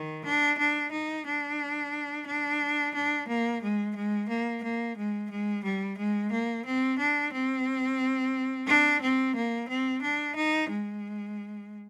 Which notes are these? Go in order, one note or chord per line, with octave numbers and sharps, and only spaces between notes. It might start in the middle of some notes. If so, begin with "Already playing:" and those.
Already playing: D#3
D4
D4
D#4
D4
D4
D4
A#3
G#3
G#3
A#3
A#3
G#3
G#3
G3
G#3
A#3
C4
D4
C4
D4
C4
A#3
C4
D4
D#4
G#3